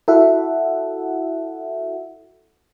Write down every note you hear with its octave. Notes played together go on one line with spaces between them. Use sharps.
E4 F#4 A4 E5 F#5